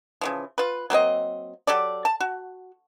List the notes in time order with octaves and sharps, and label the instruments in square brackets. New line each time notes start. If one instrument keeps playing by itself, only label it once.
[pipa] C#3 E3 F3
F4 B4
F#3 A#3 C4 D#5
F#3 G4 A4 D5
A5
F#4